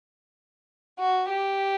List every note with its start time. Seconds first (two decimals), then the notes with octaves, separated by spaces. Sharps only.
0.99 F#4
1.29 G4